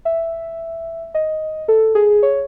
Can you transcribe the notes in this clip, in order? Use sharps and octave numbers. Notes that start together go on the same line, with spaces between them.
E5
D#5
A4
G#4
C#5